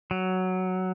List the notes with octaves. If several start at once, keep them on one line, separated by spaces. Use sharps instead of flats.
F#3